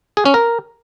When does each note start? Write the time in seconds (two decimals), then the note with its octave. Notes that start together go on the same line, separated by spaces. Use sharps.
0.17 G#4
0.25 C#4
0.34 A#4